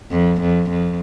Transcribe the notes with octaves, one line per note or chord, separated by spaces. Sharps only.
F2
F2
F2